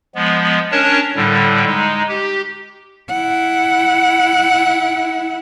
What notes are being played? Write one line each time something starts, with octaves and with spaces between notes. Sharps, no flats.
F3 G#3 B3
C#4 D4 A#4 C#5 A5
A2 D3 G3
G#3 D#4
G4
E4 F#5